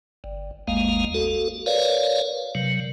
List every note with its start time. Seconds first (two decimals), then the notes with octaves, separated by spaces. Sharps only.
0.24 G1
0.68 G#1 D#2 G#3 A#3 F5
1.14 F#4 A4
1.66 A#4 B4 C#5 D5 F5
2.55 C3 F#3